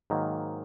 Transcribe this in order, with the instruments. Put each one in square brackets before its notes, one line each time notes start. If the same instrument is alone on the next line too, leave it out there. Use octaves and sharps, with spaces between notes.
[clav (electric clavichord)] G#2 D#3 F#3 A#3